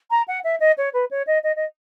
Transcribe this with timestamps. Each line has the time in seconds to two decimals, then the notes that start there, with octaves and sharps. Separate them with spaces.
0.10 A#5
0.28 F#5
0.44 E5
0.60 D#5
0.77 C#5
0.93 B4
1.11 C#5
1.27 D#5
1.43 D#5
1.56 D#5